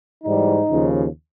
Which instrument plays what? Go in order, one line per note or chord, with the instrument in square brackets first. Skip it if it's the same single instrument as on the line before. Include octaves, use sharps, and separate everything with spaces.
[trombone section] G#2 E3 G3 D#4
D#2 C#3 F3